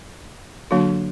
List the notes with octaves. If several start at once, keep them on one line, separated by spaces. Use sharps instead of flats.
D3 F#3 A#3 D4 F#4